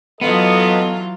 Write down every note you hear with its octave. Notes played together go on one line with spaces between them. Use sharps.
E3 F#3 B3 F4 A4 D#5